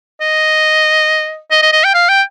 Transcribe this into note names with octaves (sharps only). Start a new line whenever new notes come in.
D#5
D#5
D#5
D#5
G5
F5
G5